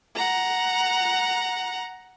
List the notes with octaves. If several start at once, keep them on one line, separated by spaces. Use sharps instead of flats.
F#5 A#5